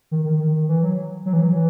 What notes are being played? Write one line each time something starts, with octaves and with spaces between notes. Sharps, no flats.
D#3
D#3
D#3
E3
F#3
F#3
E3
F#3
E3